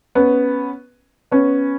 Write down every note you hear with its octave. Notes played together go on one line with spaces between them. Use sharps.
B3 C#4
B3 C#4